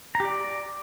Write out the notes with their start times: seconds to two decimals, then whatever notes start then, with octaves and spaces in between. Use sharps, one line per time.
0.15 A#5
0.20 G4
0.25 D5